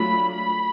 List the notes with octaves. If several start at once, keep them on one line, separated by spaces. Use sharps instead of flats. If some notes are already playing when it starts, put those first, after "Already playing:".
Already playing: F#3 A3 D4 F4 B5
B5